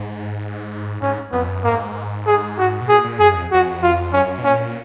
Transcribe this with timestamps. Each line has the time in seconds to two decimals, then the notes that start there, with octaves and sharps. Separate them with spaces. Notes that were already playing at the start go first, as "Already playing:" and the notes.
Already playing: G#2
1.02 G#2 C#4
1.32 F2 B3
1.48 F#2
1.64 G#2 A#3
2.26 G#4
2.58 F#4
2.81 B2
2.88 A#2 G#4
3.04 A#2
3.19 F#2 G#4
3.35 F2
3.51 F2 F#4
3.82 F4
4.13 F#2 C#4
4.38 B2
4.44 A#2 C#4